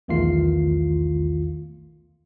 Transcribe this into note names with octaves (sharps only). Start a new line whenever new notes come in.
B1 E2 D#3 A3 F4 C7